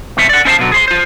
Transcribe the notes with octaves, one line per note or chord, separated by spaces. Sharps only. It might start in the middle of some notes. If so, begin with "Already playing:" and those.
C#2 B2 F3 C4 C#5 E5
D5 F#5
C#4 E4 C5 D5 F5 A5
B2 D3 F#3
G#4 C5 C6
F4 C5